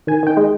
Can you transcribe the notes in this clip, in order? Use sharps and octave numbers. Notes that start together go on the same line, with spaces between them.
D#3 G#5
D#3 G5
G#3